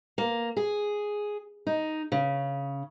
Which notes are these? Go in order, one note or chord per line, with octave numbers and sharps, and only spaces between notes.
A#3
G#4
D#4
C#3